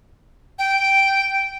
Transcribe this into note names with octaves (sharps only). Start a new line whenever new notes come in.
G5